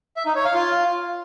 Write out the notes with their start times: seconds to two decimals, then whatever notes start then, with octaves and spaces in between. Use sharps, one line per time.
0.17 E5
0.26 D#4
0.36 C#5
0.45 F5
0.54 F4